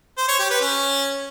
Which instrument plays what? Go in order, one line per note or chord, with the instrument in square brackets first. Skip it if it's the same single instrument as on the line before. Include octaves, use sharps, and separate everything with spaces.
[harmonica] C5
C#5
G4
B4
C#4